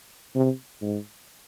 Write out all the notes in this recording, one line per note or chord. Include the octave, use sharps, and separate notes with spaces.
C3
G#2